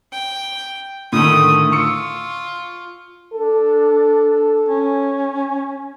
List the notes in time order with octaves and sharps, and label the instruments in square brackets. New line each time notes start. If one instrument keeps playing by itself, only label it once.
[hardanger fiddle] G5
[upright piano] A2 D3 D#3 [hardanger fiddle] A3 D#6
[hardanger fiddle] F4 [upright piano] C#6 E6 C#7
[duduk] D4 [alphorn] A4
[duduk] C#4